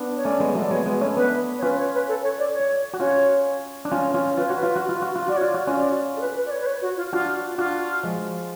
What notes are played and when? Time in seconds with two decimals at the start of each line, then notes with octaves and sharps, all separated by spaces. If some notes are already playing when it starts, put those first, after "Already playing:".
Already playing: B3 D4
0.17 C#5
0.25 A3 C#4 D5
0.40 G#3 B3
0.55 F#3 A3
0.62 D5
0.71 G#3 B3 C#5
0.86 G#3 B3 C#5
1.01 A3 C#4 C#5
1.17 B3 D4 B4
1.58 C#5
1.62 C#4 F4 B4
1.78 C#5
1.94 B4
2.08 A4
2.23 C#5
2.39 D5
2.54 C#5
2.93 F#4
3.00 C#4 F4 C#5
3.85 D4
3.92 C#4 F4
4.14 C#4 F4
4.37 F4 B4
4.46 C#5
4.50 F#4 B4
4.63 F4
4.76 F#4
4.89 F4
5.02 F#4
5.16 F4
5.28 F#4 D5
5.37 C#5
5.41 F4 D5
5.54 F#4
5.67 C#4 F4
5.75 D5
6.17 A4
6.21 B4
6.36 B4
6.46 D5
6.51 C#5
6.61 B4
6.66 C#5
6.82 F#4
6.97 F4
7.13 D4 F4 F#4
7.58 D4 F4 F#4
8.03 F3 G#3